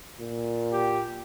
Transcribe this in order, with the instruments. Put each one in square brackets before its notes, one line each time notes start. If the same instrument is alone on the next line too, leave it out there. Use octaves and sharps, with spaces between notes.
[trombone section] A#2
[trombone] G4